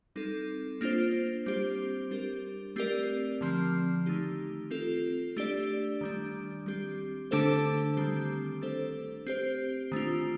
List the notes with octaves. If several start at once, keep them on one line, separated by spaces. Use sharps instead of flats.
G3 C4 D#4 A4
A#3 D4 F4 C5
G3 C4 G4 C5
G3 D4 G4 A#4
A3 C4 G4 A#4 D5
D3 F3 C4
D#3 A3 D#4 G4
C4 F4 A4
A3 D4 G4 D5
D#3 G3 D4
G3 C4 G4
D3 A3 D4 A4 C5
D#3 G3 C4 G4
A3 D4 A4 C5
C4 G4 C5
D#3 A3 D4 F4